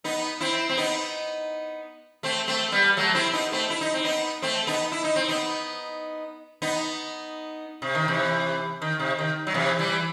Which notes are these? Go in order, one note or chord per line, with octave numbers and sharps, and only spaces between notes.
B3 D#4
C4 E4
C4
B3 D#4
A3 C4
A3 C4
G3 B3
F#3 A3
C4 E4
B3 D#4
A3 C4
E4
D#4
C4
B3 D#4
A3 C4
B3 D#4
E4
D#4
C4
B3 D#4
B3 D#4
C3
D#3
C3 E3
D#3
C3
D#3
F#3
C3 E3
E3 G3